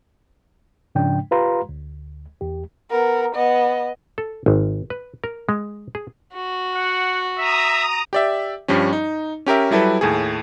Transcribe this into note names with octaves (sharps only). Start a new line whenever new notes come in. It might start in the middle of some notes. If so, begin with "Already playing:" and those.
G#2 C#3 F3 D4 G5
F4 G4 B4 F5 A#5 C6
D2
E2 G4
B3 A#4
B3 D#5
A4
G#1
B4
A#4
G#3
G#4
F#4
F#5
E5 A#5 D#6
G4 D5 E5
G2 F3 G3 C#4
D#4
C#4 G4 A#4 E5
F#3 G3 E4 A4 B4
D#2 A2 G#4